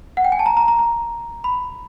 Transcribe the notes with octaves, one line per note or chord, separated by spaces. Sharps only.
F#5
G5
G#5
A5
A#5
A#5
A#5
A#5
B5